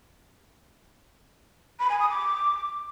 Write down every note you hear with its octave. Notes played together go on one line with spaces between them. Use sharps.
B5
G#5
D#6
D6